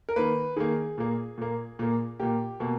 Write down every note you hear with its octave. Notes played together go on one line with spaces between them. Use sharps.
A#4
D#3 A#3 B4
D#3 A#3 G#4
A#2 A#3
A#2 A#3
A#2 A#3
A#2 A#3 G4
B2 A#3